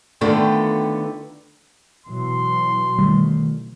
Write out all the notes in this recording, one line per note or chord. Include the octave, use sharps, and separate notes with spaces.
D3 D#3 A3 B3 F4 G5
B2 E3 F#3 C6
D#3 G3 A3